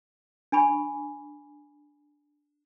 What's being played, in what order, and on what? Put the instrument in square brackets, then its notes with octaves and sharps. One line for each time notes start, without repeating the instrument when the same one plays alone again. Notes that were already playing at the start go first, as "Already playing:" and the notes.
[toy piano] D4 G#5 B5 C#6